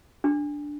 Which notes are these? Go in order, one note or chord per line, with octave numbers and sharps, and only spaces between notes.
D4